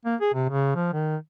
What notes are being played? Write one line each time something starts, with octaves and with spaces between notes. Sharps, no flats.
A#3
G#4
C3
C#3
F3
D#3